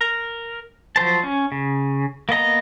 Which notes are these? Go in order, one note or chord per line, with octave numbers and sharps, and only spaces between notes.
A#4
F3 F#3 C5 A5
C#4
C#3
A#3 B3 D#5 A#5